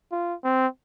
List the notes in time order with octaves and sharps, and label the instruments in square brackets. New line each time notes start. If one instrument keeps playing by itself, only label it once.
[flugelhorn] F4
C4